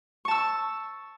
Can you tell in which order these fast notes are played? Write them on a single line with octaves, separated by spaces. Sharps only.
C#6 A5 E6